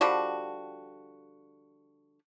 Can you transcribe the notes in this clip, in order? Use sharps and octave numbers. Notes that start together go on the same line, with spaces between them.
D3 F3 G3 F#4